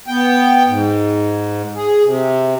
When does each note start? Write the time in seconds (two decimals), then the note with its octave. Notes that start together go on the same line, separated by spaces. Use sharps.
0.08 B3 G5
0.68 G#2
1.74 G#4
2.04 C3